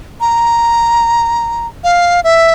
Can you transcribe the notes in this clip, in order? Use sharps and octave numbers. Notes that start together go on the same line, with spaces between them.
A#5
F5
E5